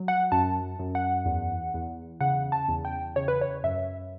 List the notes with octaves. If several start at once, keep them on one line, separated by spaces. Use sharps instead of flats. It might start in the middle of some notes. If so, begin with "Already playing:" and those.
Already playing: F#3
F#5
F#2 A5
F#2
F#5
E2
E2
C#3 F#5
A5
E2
G5
C#3 C#5
B4
C#5
F#2 E5